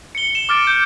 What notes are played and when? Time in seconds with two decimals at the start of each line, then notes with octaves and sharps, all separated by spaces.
0.15 C#7 G7
0.35 E7
0.49 D6 F6 A6 D7
0.67 G6